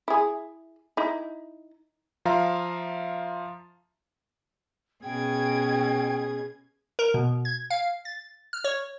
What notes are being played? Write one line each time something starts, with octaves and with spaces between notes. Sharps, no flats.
E4 G#4
D#4 E4
F3 F4 E5 F5 A#5
B2 C#4 G#4 G5 G#6
A#4
B2
G#6
F5
A6
F6
C#5